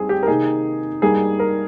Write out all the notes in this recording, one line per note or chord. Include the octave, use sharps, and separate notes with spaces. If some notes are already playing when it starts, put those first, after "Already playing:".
Already playing: G2 G3 C4 D#4 G#4
G4
A#4
C3 D#3 A#3 D#4 G#4
G2 G3 A#3 D#4 G#4
A#4